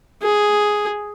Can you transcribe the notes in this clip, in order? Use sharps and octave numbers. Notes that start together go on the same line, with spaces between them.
G#4